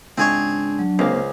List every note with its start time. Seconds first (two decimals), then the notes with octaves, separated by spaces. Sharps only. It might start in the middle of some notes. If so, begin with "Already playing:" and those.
0.18 C#2 G#2 C4 D4 G#4 C#5
0.79 F#3
0.99 C#2 C3 A#3 C5